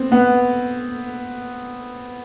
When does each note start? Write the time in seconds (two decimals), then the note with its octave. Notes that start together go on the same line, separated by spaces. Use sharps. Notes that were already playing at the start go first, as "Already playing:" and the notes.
Already playing: B3 C4
0.12 B3